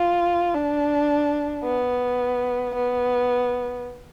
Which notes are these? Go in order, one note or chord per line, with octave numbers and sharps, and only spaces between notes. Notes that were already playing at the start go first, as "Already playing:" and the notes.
Already playing: F4
D4
B3
B3